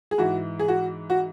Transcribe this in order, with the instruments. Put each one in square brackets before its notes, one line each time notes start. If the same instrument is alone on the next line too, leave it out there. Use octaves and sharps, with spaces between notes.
[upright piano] G#4
G#2 E3 F#4
G#4
F#4
F#4